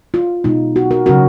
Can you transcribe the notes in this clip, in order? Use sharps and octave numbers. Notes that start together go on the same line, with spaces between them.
F4
B2 G#3 D#4
F#4
F#4 A#4
C#3 F#3 C#4 F#4 A#4